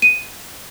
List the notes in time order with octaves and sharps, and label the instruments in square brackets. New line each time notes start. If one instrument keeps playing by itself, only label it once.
[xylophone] D#7